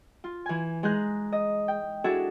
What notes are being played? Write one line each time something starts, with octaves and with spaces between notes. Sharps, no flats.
F4
E3 G#5
G#3 D#4 G#4 A#5 F#6 G6
D#5
G5
D4 E4 F#4 G#4 A4 E5